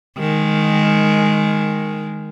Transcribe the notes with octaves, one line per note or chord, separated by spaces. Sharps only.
D#3 G#3